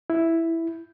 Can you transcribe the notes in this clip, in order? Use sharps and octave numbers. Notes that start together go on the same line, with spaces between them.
E4